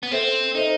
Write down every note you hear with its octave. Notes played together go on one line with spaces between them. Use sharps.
B3
C4 A4 C5 E5
D#4 A4 C5 E5